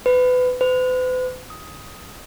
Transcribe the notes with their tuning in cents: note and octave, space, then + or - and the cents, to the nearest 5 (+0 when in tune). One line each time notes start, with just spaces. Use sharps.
B4 +25
B4 +45
D#6 +15